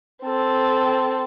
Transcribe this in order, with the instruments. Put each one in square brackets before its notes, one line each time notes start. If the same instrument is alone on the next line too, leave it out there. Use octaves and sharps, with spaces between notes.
[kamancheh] C4 A4